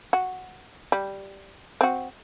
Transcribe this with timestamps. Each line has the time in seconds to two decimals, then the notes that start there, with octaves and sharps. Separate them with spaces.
0.13 F#4
0.92 G3
1.81 C4 F#4